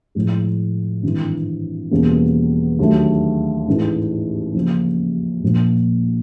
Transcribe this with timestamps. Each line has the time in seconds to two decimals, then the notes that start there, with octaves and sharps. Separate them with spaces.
0.15 A2 F3 G#3
1.03 G#1 G2 E3 G3
1.91 E2 B2 G3 A#3 C#4
2.79 D#2 D3 F#3 A3
3.67 A1 G#2 E3 A3
4.54 C#3 F3 A#3
5.42 A#1 A#2 F3 A#3